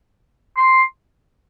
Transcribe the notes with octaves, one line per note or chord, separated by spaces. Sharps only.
C6